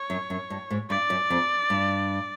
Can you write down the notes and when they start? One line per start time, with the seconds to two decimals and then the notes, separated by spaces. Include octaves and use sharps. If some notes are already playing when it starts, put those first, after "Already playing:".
Already playing: C#5
0.10 F#2
0.30 F#2
0.50 G2
0.70 G#2
0.90 G2 D5
1.10 F#2
1.30 F2
1.70 G2